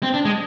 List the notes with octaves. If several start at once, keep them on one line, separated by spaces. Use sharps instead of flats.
C4
D4
G#3